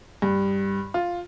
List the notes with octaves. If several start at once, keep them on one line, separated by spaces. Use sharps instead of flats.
G2
F4